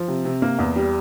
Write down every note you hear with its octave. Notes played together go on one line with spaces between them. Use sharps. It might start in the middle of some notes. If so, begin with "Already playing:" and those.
Already playing: F3
C3
C3
A#3
E2
G3